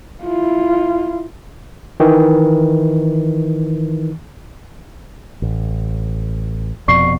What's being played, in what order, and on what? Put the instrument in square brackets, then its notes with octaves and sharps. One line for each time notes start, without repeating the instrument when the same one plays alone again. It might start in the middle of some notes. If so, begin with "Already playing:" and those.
[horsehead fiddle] E4 F4
[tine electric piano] D#3 E3
[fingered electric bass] A1
[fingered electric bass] F1 F2 B2 [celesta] D5 C#6 C7